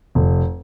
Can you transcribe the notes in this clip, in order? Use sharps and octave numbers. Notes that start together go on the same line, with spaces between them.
F1